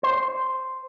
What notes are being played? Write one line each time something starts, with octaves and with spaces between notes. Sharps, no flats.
C5